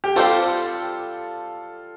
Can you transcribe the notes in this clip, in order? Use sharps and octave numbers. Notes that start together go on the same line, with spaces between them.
G4
G3 C4 F4 G4 A4 C5